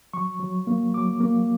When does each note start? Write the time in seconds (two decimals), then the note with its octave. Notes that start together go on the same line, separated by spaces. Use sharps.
0.13 F#3 C#6
0.40 F#3
0.67 A#3
0.93 F#3 D6
1.20 A#3